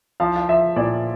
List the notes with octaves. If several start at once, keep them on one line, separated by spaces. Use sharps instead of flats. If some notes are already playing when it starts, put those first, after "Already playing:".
F3 F5
F5
F3 E5
A#2 D5